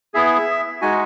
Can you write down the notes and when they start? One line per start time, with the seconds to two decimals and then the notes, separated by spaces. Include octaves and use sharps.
0.14 B3 E4 G#4 E5
0.81 G#3 D#4 F#4 G#5